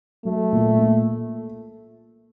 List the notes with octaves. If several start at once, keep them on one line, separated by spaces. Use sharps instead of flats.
F#3 A3
A#2
A#3